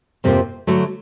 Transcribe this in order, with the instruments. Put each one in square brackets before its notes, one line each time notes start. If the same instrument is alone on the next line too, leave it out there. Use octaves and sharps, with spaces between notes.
[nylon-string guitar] F2 C3 F3 A#3
D3 F#3 A3